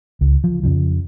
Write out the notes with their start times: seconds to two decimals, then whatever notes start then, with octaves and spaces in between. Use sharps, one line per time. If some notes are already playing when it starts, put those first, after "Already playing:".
0.21 C#2
0.44 F3
0.63 F2 C#3 F3